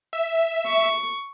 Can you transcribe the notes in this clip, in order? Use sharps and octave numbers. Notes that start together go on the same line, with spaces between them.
E5
C#6